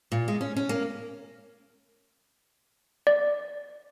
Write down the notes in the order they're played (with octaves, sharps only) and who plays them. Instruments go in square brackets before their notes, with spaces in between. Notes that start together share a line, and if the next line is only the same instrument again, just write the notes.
[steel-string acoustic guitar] A#2
G#3
C#4
C#4
A#3
[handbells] D5